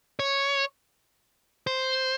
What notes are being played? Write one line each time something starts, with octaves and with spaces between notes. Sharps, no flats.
C#5
C5